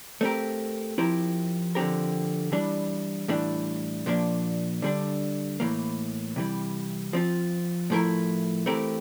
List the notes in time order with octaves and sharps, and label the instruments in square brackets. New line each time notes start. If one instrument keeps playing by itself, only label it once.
[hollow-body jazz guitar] A3 C4 G4 A#4
F3 C4 E4 G4 A#4
D3 F3 C4 G4 A#4
E3 G3 D4
A2 E3 G3 D4
A#2 F3 A#3 D4
D3 G3 D4
A2 E3 A#3
C3 E3 G3
F3 C4 F4
A2 F3 A3 E4 A#4
E3 A3 C4 G4 A#4